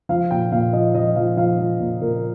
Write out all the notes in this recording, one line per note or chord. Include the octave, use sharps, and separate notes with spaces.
F3 F5
A#2 G5
A#2 F5
F3 D#5
F3 D#5
F3 F5
F3 F5
F3
A#2
A#2 A#4